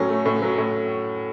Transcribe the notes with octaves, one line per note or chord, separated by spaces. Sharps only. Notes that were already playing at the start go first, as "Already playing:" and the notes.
Already playing: A2 F#3 C#4
A3
A2
F#3
A2